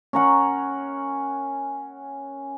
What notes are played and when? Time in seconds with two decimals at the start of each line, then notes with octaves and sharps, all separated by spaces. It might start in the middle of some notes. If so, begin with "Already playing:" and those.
0.13 C#4 A#4 F#5